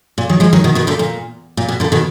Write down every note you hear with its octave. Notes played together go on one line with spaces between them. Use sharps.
A#2
D#3 F#3
F3 G#3
D#3 F#3
B2 D#3
B2 D#3
A#2 D3
A#2
A#2
B2
A#2 D3
B2 D#3